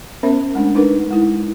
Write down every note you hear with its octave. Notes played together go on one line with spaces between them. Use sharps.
B3 C#4 A#4 C5 E5
G#3 A3 D4
D4 D#4 A#4 B4
G#3 E4